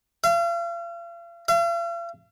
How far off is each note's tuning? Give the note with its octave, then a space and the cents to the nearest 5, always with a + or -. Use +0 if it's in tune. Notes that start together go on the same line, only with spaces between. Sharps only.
F5 -40
F5 -45